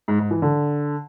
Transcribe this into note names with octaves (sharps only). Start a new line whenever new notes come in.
G#2
G#2
E3
D3